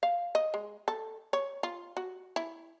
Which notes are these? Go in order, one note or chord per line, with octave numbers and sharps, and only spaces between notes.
F5
D#5
G#3
A4
C#5
F4
F#4
E4